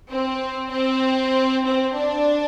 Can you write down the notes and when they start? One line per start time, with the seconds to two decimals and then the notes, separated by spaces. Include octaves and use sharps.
0.11 C4
0.72 C4
1.65 C4
1.95 D4